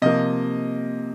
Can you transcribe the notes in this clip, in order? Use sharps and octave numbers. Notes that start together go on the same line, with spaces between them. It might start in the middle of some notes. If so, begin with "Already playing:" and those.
C3 F3 A#3 D#5